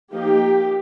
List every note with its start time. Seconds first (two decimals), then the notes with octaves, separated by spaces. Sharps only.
0.11 F3 A#3 D#4 G4